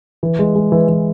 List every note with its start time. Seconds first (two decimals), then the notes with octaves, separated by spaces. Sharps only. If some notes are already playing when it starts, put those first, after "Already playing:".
0.23 E3
0.39 G#3
0.55 G#3
0.72 E3
0.89 E3